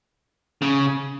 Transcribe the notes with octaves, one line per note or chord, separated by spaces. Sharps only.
C#3